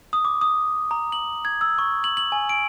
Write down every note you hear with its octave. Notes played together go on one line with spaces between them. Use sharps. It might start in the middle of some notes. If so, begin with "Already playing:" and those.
D#6
D6
D#6
A#5
F#7
G#6
E6
C#6
F#7
F#7
G#5
D7